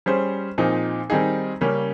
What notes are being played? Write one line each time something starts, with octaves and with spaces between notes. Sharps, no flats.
G3 C#4 G#4 C5
A#2 F3 C4 D#4 G#4
D#3 G3 C4 D#4 G#4
C#3 G3 A#3 C#4